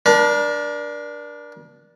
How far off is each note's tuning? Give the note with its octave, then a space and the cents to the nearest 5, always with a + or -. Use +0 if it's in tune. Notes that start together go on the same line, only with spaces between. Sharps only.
D4 +0 A#4 +40